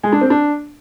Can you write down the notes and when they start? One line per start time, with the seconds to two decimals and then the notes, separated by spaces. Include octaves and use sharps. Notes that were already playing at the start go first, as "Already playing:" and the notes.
0.03 G#3
0.12 D4
0.21 C4
0.30 D4